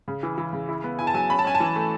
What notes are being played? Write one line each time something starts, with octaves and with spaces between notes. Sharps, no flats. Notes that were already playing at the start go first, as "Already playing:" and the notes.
C#3
E3
E3
C#3
E4
B3
E4 G#5
A5
F#3 G#5
C#4 B5
A5
C#4 G#5
A5
E3
A3